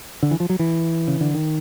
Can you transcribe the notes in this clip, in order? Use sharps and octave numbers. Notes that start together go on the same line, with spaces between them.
D3
E3
F3
F#3
E3
C#3
D3
D#3